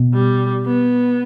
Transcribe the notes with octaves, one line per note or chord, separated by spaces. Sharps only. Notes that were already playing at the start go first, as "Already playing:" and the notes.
Already playing: B2
G3
B3